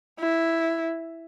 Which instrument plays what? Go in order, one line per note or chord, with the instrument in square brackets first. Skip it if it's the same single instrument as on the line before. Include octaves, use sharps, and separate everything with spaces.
[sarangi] E4